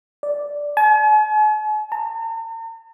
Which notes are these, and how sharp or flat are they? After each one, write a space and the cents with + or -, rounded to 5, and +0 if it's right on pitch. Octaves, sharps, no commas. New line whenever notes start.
D5 -5
G#5 +45
A#5 -45